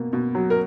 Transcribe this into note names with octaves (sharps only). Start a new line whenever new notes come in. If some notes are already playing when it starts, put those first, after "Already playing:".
Already playing: B2 A#3
B2
F#3
A#4